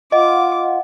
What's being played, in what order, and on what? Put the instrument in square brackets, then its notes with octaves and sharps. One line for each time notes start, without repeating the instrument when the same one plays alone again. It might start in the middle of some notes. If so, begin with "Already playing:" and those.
[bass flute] F4 [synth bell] D#5 [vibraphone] F5 F#5 [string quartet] D6